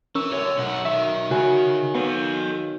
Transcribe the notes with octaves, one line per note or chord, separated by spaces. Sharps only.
E3 C#4 A#4 C#6 E6
F#2 D3 C#5
B1 F#2 F#5
D#3 E5
C#3 F#4 C#5 G#5
B3 A4 F5